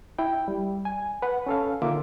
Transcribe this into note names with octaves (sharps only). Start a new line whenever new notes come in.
E4 G5
G3
G#5
B4 F#5
C#4 A4 F5
D3 D#3 A#3 F4 E5 D6